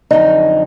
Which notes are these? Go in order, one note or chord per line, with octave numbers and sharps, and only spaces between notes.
F2 D3 F#3 D#4